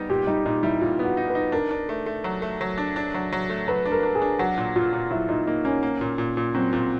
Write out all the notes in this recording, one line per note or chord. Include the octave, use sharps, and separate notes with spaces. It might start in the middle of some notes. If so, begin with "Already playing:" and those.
Already playing: G3 B3 D#4
A#2 G4
G3 D#4
A#2 D#4
G3 E4
A#2 F4
B3
F#4
D#4
B4
D#4
D4 A#4
D4
A3
A3
F#3
A3
F#3
D4
D4
F#3
F#3
A3
F#3 B4
D4
A#4
D4
G#4
D4
F#3 F#4
A#2
A#2 F4
A#2
F#3 E4
A#2 D#4
A#3 D#4
A#3 C#4
A#3
A#2
A#2
A#2
F#3 C4
A#2